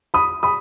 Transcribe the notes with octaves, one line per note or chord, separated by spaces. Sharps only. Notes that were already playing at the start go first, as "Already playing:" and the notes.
B5 D#6
B5 D#6